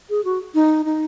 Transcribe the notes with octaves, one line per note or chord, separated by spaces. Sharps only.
G#4
F#4
D#4
D#4